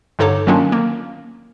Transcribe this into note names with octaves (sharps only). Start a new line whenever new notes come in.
G2 D3 D#4 A4 C#5 D6
D#3 F#3 A#3 C#4 D4 F4
A#3